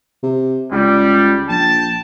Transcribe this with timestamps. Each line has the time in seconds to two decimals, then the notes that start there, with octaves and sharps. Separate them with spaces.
0.23 C3
0.72 C#2 G3
1.49 A#1 G5 A5